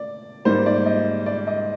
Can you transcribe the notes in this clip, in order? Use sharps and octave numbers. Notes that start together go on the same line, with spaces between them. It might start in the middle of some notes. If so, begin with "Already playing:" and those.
Already playing: D5
G#2 G3 A#3 C5
D5
D#5
D5
D#5